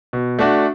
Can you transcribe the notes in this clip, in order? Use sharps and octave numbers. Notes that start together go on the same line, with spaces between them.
B2
A3 D4 F#4